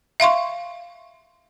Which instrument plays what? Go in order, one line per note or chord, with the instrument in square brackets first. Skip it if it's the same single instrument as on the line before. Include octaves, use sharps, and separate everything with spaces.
[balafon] E5 F5 C6 C#6